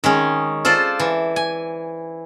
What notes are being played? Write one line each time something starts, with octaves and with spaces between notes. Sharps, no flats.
D#3 G#3 C#4
F4 A4 C5 D5
E3
G#5